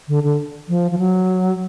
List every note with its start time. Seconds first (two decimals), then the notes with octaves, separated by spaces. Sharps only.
0.08 D3
0.23 D3
0.69 F3
0.91 F3
0.99 F#3